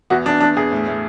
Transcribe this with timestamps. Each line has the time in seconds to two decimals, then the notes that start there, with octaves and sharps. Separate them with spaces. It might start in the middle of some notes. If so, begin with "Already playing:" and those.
0.10 E2 F#4
0.26 E2 D4
0.40 E2 D4
0.57 E2 G#4
0.72 A2
0.87 A2